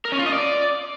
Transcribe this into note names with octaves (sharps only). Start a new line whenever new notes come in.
A#4
C#4
F4
D#5
D5